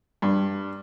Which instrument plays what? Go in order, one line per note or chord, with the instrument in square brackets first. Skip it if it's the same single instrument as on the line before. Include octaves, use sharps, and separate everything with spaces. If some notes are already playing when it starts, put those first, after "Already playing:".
[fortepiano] G2